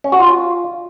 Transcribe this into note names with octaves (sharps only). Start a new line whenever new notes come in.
C#4
F#4
F4